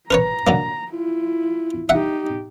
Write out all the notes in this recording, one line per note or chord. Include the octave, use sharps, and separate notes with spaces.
A#4 B4 C#5 A#5
D3 F#3 A#3
E4 F4
D#4 G4 E5 F#5